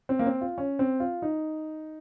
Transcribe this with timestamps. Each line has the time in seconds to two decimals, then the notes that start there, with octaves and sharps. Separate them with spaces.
0.09 C4
0.19 A#3
0.26 C4
0.41 F4
0.58 C#4
0.79 C4
1.00 F4
1.22 D#4